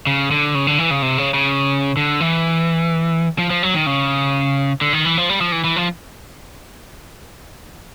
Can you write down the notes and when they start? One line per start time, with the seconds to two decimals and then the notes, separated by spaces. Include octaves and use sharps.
0.07 C#3
0.31 D3
0.55 C#3
0.67 D3
0.78 E3
0.91 C#3
1.02 C3
1.18 C#3
1.34 C#3
1.97 D3
2.20 E3
3.39 F3
3.50 F3
3.63 F#3
3.74 D#3
3.86 C#3
4.81 D3
4.93 D#3
5.05 E3
5.17 F3
5.30 G3
5.41 F3
5.52 E3
5.64 E3
5.76 F3